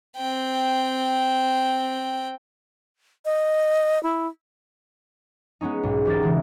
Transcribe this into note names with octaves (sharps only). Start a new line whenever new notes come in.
C4 G5
D#5
E4
G#3 B3 C#4 D#4
B1 G#2
E1 G4 A#4 A6
C#3 E3 G#3